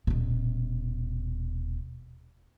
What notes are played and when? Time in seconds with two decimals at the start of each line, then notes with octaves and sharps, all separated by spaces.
0.07 D#1 B2